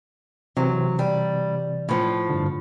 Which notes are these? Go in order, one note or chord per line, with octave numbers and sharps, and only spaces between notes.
C3 E3 F#3 C4
G3
A2 F3
G2 D3